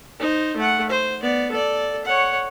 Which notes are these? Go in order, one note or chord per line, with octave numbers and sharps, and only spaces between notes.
D#4 C5
A3 F#5
C5
B3 D5
A4 D5
C#5 F#5